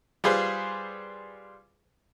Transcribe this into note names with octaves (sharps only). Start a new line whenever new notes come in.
G3 F4 G#4 B4 C5